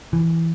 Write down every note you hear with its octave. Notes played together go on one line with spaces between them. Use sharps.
E3